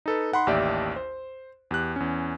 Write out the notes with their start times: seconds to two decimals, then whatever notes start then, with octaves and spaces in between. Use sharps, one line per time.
0.06 D#4 A4 B4
0.32 D#4 F#5 B5 C6
0.47 A1 D#2 G4 D5 E5
0.96 C5
1.71 E2 G4 F#6
1.96 E2 C#4